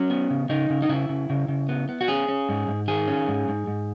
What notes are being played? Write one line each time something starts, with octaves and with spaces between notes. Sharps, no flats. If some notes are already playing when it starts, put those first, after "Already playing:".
Already playing: F#3 C#4
B3
C#3
C#3 D#4
C#3
D#4
C#3 E4
C#3
C#3
C#3
B3
B3
F#4
C#4 G#4
C#4
G#2
G#2
D#3 G#4
C#4
G#2
G#2
G#2